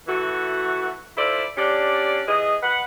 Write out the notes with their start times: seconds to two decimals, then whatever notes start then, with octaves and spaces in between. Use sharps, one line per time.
0.07 E3 A3 F#4
1.17 E4 F4 A4 C5 D5
1.56 C#4 D4 G4 D5
2.27 E3 G#4 D#5
2.63 B4 F#5